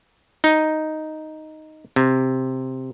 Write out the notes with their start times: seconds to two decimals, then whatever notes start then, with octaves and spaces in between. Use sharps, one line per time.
0.44 D#4
1.96 C3